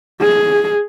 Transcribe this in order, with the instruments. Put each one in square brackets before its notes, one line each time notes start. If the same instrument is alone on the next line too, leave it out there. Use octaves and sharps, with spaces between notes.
[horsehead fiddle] G#4